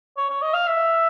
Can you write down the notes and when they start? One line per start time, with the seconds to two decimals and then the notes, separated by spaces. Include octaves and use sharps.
0.17 C#5
0.29 C#5
0.42 D#5
0.54 F5
0.67 E5